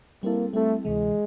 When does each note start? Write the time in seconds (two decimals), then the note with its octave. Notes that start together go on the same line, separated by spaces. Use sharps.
0.23 G3 A#3 C4 E4 A4
0.53 G3 A3 C4 E4 A4
0.84 D2 C3 E3 G#3